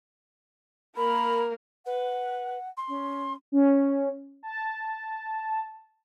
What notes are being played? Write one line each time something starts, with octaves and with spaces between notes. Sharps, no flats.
A#3 A#4 B5
B4 F#5
C6
C#4
C#4
A5